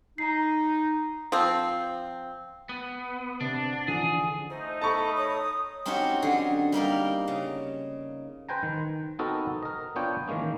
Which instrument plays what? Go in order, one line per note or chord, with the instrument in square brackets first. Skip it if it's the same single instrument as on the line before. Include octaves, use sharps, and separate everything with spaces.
[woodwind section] D#4 [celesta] A#5 C7
[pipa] F3 C4
[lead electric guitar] B3
[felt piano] C3 [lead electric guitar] D4
[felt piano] F#5
[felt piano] D3 E3 F3 [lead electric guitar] G#4
[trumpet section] A3 D#4 [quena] C5
[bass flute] A4 [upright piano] A5 C#6 [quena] B5
[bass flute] C#5 [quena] D#6
[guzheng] C4 C#4 D#4 F#4 G4 C#5
F#2 D3 G#4
G3 A#3 D#4 A#4
C#3
[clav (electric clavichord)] B4 C5 G5 G#5 A#5
D#3
B3 C4 D#4 F#4 A4 A#4
A#4 D#5
B3 D4 F4 C#5 G5
D#3 E3 G#3 A#3 C#4